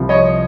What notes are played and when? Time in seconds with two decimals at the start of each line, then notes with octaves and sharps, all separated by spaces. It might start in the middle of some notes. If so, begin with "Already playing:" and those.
Already playing: C2 C3 F3
0.09 C#5 D#5